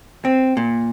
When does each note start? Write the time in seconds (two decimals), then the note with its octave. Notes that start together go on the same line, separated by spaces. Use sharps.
0.25 C4
0.57 A#2